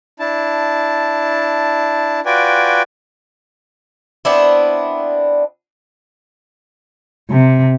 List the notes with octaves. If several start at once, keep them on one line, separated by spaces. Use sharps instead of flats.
D4 E4 A5
F4 F#4 B4 D5 G5 G#5
B3 C4 D4 E4
C3